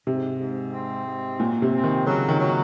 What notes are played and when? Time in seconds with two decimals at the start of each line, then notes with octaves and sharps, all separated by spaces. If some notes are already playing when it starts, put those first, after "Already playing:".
0.07 G#2 C3
0.40 G#2
0.73 C4
1.06 G#2
1.39 A#2 F#3
1.62 C3
1.74 C4
1.84 D#3
2.06 C#3 F#3
2.29 D#3
2.39 F#3